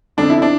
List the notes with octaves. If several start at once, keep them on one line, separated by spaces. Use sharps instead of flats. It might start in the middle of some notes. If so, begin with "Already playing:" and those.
F1 F2 D3 D4
E4
D4